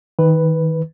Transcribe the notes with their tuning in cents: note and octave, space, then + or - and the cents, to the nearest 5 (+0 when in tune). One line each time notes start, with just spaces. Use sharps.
D#3 +25 B4 +0